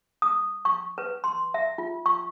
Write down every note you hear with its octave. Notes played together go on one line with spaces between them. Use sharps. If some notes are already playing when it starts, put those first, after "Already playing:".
D#6
C#6
B4
C6
E5
F4
C#6